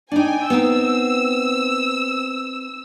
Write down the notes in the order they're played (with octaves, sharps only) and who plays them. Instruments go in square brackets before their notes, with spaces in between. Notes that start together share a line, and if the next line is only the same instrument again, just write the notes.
[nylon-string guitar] D4 D#4 [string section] G5 G#5
[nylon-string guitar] B3 C4 D#4 [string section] E6